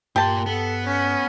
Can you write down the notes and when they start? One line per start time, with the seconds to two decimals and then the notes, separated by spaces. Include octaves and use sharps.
0.16 G2 A#2 G4 A5 C6
0.46 B3 A4
0.84 C#4